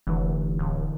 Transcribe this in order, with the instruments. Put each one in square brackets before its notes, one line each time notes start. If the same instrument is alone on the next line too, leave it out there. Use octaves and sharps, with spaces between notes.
[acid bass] F1 [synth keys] D3 E3
[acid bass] D1